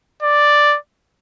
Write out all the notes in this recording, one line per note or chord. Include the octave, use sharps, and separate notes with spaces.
D5